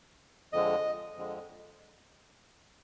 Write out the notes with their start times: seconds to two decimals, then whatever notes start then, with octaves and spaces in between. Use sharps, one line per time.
0.53 F2 D3 G#3 D#5
1.16 F2 D3 G#3